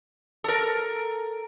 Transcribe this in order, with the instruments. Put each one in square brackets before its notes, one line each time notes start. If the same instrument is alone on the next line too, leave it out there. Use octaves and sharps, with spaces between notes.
[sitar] A4 A#4